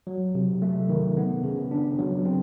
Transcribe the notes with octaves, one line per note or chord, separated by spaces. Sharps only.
F#3
C3
A3
D#3
B3
C#3
D4
F#3
C4